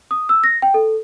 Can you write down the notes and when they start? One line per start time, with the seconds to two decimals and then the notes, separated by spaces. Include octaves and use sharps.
0.11 D#6
0.29 E6
0.44 A#6
0.62 G5
0.74 A4